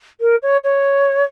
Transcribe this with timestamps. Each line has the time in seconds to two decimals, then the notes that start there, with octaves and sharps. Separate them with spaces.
0.20 A#4
0.42 C#5
0.63 C#5